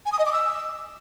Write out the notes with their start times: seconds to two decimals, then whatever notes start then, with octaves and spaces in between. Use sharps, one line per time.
0.06 G#5
0.12 D#6
0.19 D#5
0.26 D6
0.32 E6